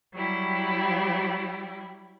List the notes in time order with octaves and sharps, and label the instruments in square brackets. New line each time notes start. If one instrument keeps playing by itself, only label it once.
[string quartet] F#3 G3 E4 G4